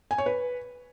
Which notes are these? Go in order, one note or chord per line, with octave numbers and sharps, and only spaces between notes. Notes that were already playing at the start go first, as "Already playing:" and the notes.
G#5
C#5
B4